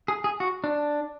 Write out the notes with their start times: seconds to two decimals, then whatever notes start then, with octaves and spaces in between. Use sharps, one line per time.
0.08 G#4
0.24 G#4
0.40 F#4
0.64 D4